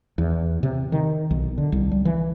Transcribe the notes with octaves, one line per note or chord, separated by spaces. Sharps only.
E2
C3
D#3
B1
D3
C2
G3
E3